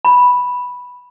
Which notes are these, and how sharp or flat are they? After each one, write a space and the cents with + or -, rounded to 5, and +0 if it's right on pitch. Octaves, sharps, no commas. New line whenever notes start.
B5 -5